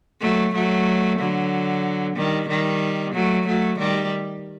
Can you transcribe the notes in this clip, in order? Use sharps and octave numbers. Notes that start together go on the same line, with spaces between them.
F#3 A3
F#3 A3
D3 F#3
D#3 G3
D#3 G3
F#3 A3
F#3 A3
D#3 G3